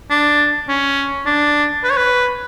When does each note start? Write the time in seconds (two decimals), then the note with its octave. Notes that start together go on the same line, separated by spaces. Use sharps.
0.10 D4
0.68 C#4
1.26 D4
1.83 B4
1.91 C#5
1.97 B4